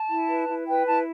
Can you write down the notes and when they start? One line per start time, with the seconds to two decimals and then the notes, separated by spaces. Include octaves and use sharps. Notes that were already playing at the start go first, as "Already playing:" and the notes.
Already playing: A5
0.09 E4
0.29 B4
0.48 E4
0.67 B4 G5
0.87 E4 A5